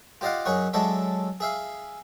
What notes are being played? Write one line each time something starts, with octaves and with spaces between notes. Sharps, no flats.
F4 G4 D5 D#5 F5 F#5
F#2 D#4 G#4 C#5 F#5 C#6
F#3 G#3 D4 A4 C#5 E5
G#4 E5 F5